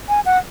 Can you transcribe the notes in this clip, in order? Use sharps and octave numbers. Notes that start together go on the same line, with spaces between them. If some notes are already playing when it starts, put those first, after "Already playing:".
G#5
F#5